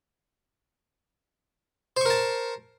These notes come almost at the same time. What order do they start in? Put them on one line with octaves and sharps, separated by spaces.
C5 C#6 A#4 A5